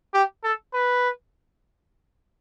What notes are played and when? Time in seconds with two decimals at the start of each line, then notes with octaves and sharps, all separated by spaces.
0.14 G4
0.44 A4
0.73 B4